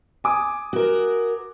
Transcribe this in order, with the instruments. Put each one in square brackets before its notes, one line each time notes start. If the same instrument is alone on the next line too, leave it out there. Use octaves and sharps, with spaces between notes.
[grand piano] G#5 D6 D#6
[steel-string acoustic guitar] F#4 A#4